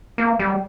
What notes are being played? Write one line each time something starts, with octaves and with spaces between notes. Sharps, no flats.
A#3
G3